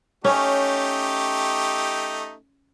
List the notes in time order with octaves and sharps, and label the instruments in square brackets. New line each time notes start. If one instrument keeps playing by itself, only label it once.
[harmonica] A3 D#4 G4 [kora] C#4